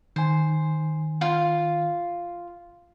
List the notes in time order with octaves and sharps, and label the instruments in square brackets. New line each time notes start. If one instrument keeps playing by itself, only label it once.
[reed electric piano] D#3 G#5 [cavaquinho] C5
[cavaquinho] F4 F5